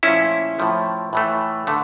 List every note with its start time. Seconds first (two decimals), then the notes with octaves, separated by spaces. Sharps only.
0.03 A#2 F3 A3 C#4 E4
0.59 A2 F3 A3
1.13 A2 E3 A3
1.67 D3 A3